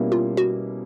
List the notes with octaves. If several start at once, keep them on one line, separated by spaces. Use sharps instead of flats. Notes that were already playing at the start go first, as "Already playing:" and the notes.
Already playing: B2 G3 A#3 C#4 E4
F4
F#4